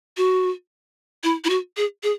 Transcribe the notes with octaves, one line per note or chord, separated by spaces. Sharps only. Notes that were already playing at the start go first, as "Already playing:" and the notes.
F#4
E4
E4
F#4
G#4
G#4